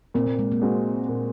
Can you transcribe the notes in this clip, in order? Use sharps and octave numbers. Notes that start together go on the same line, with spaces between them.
A#2 C4
A#3
G#3
A#3
G#3 C4 F#4
A#2